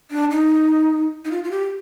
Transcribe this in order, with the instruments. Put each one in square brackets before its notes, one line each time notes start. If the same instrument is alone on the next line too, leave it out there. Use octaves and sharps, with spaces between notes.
[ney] D4
D#4
D#4
F4
F4
G4